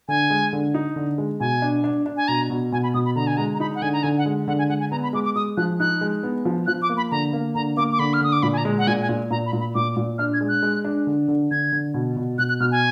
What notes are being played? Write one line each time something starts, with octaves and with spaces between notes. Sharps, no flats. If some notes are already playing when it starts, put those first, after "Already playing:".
D3 G#5
G#3
D3
D#4
D3
G#3
B2 G#5
D4
D4
D4
G#5
B2 A#5
B2
B2 G#5
B5
B2 D#6
B5
D3 A#5
G#5
G#3 A#5
A#5
D#4 B5
F#5
D3 G#5
A#5
D3 G#5
F#5
G#3
D3 F#5
G#5
G#3 F#5
G#5
B3 A#5
B5
G#3 D6
D6
G#3 D#6
F3 F#6
D#4 F#6
G#3
B3
F3
F3 F#6
D6
A#3
B5
D3 A#5
A#3
D3 A#5
A#3 D6
D6
D3 B5
F6
D3 D#6
D6
A#2 B5
G#5
A#5
G#3
F#5
A#2 G#5
G#5
A#2
A#2 A#5
B5
A#2
B5
A#2 D6
A#2
D4 F6
G#6
G#3
F#6
G#3
D4
D3
D3
D3 G#6
D3
B2
B2
B2 F#6
F#6
B2 F6
G#5